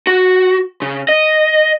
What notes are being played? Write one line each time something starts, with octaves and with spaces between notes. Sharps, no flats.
F#4
C#3
D#5